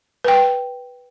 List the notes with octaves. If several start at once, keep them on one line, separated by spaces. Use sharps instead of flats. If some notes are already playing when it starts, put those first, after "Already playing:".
B4 G5